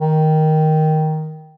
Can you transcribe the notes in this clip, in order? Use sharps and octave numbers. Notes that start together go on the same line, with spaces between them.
D#3